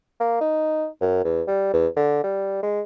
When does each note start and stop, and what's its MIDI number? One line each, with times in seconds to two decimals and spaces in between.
0.20 0.39 58
0.41 0.86 63
1.01 1.22 42
1.24 1.42 40
1.48 1.73 55
1.73 1.87 40
1.96 2.24 50
2.24 2.63 55
2.63 2.82 56